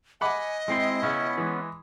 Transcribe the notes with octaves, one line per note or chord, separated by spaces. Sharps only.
D#5 F#5 G#5 B5 D6
G#3 C4 E4 C5
C#3 B3 C#4
E3 G#3